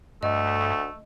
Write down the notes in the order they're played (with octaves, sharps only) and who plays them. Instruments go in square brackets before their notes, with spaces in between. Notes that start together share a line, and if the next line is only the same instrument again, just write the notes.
[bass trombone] D2 [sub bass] G2 [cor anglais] A3 [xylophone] D#5